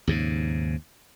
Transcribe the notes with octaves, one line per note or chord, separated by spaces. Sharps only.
D#2 G#2 C#3